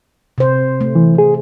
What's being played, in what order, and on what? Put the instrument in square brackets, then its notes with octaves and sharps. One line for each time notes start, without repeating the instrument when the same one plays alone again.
[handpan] C3 C5
A3
[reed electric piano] E3
G#4